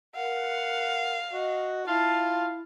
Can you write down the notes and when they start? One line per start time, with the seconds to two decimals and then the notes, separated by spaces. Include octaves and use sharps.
0.16 A#4 F5 F#5
1.33 F#4 D#5
1.88 E4 F4 F5 A5